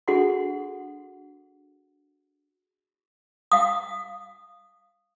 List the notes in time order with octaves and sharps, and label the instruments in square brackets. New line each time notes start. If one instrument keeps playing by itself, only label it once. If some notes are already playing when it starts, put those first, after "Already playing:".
[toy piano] D4 F#4 G#4 A4 F#5 C6
F5 D#6